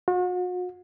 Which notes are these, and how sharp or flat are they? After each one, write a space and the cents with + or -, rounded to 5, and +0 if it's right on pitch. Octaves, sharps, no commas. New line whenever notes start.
F#4 -40